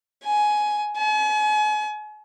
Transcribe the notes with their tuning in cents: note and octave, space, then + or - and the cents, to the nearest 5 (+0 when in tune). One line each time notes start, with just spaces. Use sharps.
G#5 +15
G#5 +40